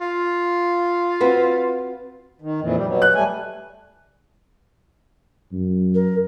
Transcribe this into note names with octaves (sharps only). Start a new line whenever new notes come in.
F4
C4 F#4 B4
D#3
F2 A#2 E3
G3
B2 F#3
F#6
G3 A3 G#5
F#2
A#4